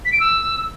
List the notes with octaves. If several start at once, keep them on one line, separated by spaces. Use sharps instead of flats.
B6
D7
E6